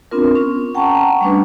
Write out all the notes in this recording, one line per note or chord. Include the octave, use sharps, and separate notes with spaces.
B3 C4 D4 F4 A#4
C#4
F#5 G5 A5 A#5 C#6
G3 A3 C#4 D4 B4